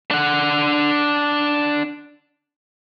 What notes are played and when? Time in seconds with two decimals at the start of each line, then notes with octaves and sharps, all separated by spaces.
0.11 D4 F#5